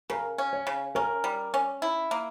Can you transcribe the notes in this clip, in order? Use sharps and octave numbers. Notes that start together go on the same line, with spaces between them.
C#3 A#4
C#4
C#5
C#3
C#4 A#4
G3
C#4
E4
A#3